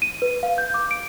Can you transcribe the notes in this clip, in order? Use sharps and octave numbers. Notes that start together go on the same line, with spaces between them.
D#7
B4
F5
G6
D6
D7